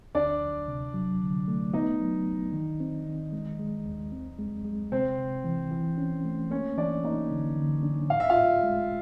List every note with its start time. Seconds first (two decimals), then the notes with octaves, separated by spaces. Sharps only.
0.15 D2 D4 D5
0.42 D2
0.68 C3
0.94 F#3
1.21 D3
1.48 A3
1.73 B3 D#4 D#5
2.00 F#3
2.27 C2
2.53 D#3
2.80 C4
3.06 D#3
3.32 G#3
3.59 G#3
3.85 D#2
4.12 C4
4.39 G#3
4.65 G#3
4.92 C3 C4 C5
5.18 C3
5.44 E3
5.71 E3
5.98 C#4
6.25 A3
6.50 A#3 C#4 C#5
6.78 E3 D4 D5
7.04 A#3 D#4 D#5
7.31 D3
7.57 D3
7.83 D4
8.10 A2 F5
8.20 E5
8.30 F4 F5
8.36 A2
8.63 G#3